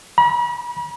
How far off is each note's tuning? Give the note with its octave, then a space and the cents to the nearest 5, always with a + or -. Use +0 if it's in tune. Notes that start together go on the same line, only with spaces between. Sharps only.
B5 -40